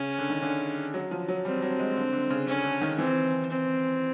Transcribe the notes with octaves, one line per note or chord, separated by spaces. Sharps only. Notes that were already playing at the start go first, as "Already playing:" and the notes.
Already playing: C#3 C#4
D3
D#3
D3
F#3
F3
F#3
G3 C4
F#3
G#3
D3
D3
C#3
D3 C#4
D3
D#3
E3 C4
C4